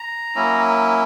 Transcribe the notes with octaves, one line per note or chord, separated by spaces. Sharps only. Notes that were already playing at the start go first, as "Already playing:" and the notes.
Already playing: A#5
F#3 A#3 C#4 E4